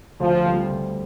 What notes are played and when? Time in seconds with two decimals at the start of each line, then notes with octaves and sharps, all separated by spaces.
0.20 D2 F3
0.46 D3 G3 C4
0.72 D2